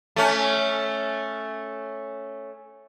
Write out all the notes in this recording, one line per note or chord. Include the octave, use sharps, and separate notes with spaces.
A3 C#4